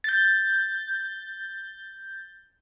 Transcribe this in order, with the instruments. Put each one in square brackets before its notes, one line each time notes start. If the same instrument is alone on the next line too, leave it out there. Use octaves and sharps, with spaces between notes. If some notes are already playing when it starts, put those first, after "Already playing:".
[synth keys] G6 A6